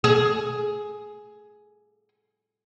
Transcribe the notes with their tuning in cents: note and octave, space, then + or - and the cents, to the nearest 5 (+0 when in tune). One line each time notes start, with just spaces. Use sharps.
G#4 +10